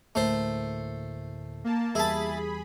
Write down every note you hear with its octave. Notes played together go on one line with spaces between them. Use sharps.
D2 A2 A3 A#3 C5
A#3 A5
E2 G3 E4 G#4 A5 B5